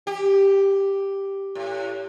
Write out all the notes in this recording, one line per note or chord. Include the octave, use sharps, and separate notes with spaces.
G4
A2